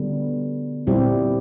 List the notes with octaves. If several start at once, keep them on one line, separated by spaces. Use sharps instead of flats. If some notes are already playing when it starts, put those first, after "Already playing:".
Already playing: D3 G3 B3
A#2 G3 C4 E4 G4